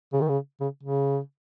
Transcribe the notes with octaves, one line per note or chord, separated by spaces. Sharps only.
C#3
D#3
C#3
C#3
C#3